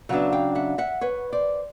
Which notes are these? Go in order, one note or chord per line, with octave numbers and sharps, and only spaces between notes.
C#3 F#3 B3 D4 E5 F#5
F5 G5
E5 F#5
E5 F#5
B4 C#5
C5 D5